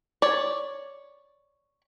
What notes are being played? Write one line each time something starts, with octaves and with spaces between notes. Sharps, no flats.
C#5 D5